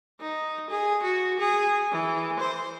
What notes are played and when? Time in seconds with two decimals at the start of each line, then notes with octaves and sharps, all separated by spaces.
0.21 D#4
0.70 G#4
1.03 F#4
1.40 G#4
1.92 E3
2.39 C5